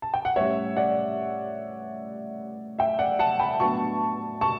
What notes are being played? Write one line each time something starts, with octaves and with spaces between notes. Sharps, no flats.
A5
G5
F#5
A2 G3 C#4 C#5 E5
D5 F#5
E5 G5
D5 F#5
F#5 A5
G5 B5
A2 F#3 B3 D4 A5 C#6
A5 C#6